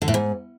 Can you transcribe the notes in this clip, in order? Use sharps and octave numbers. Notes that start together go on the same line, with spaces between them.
D3
A2
G#2